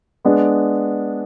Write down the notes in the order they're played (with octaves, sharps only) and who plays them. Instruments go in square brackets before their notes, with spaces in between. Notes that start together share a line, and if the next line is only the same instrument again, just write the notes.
[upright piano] G#3 B3 D4